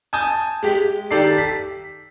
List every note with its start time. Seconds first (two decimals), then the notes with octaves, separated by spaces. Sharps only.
0.13 G#5 A5 D#6 G6
0.63 G#3 G4 B6
1.11 D#3 G4 A4 D5 C7
1.38 B6